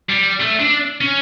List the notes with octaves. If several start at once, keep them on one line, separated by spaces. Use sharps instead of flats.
G3
A3
D4
C#4